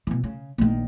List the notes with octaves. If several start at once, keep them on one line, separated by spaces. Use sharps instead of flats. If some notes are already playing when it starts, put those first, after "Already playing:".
B2 E3
C#3
A#1 D#3